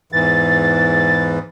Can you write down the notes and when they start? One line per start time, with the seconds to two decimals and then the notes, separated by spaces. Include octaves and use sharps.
0.12 E2 G#2 E3 A6